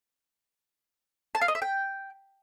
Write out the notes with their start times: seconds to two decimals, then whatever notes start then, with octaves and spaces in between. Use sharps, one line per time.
1.35 A5
1.41 F5
1.48 D#5
1.55 E5
1.62 G5